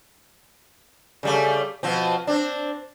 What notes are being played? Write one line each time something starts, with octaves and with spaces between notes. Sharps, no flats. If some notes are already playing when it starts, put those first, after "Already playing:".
C#3 G3 A3
B2 F3 C4
C4 D4